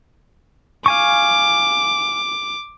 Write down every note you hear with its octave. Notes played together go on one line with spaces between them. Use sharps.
F5 G#5 C#6 D6